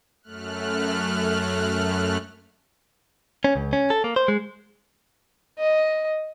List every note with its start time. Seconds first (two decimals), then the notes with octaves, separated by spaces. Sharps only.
0.22 F#2 A3 F6 F#6
3.44 C#4
3.56 C#2
3.73 C#4
3.90 A4
4.04 A#3
4.16 C5
4.28 G#3
5.59 D#5